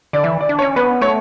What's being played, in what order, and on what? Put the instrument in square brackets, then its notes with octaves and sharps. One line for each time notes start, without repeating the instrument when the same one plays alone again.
[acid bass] D3 [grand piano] D5
[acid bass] E3 [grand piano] E5
[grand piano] D5
[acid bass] D4
[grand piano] C#5
[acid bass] C#4
[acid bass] B3 [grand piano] B4
[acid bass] A3 [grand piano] C#5